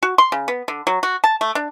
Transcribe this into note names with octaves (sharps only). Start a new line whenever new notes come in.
F#4
C6
C#3
B3
D3
F#3
F#4
A5
A3
D4